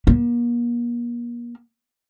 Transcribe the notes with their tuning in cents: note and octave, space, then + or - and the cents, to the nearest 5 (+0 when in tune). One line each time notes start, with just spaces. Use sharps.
A#3 +40